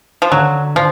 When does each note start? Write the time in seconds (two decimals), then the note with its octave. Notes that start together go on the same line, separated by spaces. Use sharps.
0.22 F3
0.31 D3 F#3
0.75 D3 F3